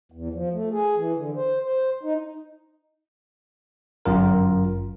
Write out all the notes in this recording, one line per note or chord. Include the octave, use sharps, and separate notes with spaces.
E2
F3
A3
G#4
E3
D3
C5
C5
D#4
G1 F#2 F4 A#4